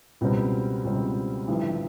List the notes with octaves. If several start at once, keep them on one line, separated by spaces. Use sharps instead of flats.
C#2 B2 G3 C4
C#2 B2 G3 C4
A1 G2 D3 F3 A3